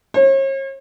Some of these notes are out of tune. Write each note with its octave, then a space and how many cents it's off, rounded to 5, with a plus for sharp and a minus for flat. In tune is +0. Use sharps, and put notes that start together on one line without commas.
C#5 -40